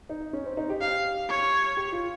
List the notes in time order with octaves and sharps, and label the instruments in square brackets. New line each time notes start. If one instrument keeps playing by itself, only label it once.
[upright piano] D#4
C#4
C4
D#4
G4
[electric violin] F5
C#5
[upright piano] G4
F4